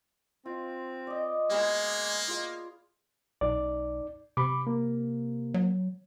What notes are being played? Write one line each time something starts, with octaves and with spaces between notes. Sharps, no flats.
C4 F4
D5 D#5
G#3 A#3 B3 F#4
F4 G#4 F5
B1 D#4 D5
C3 B5 D6
A#3
F#3